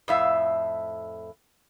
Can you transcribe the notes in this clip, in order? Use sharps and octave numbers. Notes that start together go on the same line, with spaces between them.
F2 A2 E5 F5